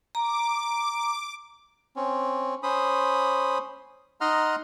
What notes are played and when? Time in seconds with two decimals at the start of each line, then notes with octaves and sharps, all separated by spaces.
0.15 A#5 D6
1.96 C4 C#4
2.63 C#4 C5 B5 D#6
4.21 D#4 D#5 F#5 A#5 C6 F6